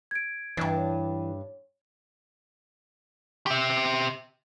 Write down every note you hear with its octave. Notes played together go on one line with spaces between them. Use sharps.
G#6 D7
G2 E3 D4
C#5
G4 E5